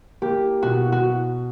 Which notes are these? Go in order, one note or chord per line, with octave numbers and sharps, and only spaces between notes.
A#3 G4
B2 F#4
F#4